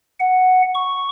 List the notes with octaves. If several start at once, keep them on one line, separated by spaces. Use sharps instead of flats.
F#5
C#6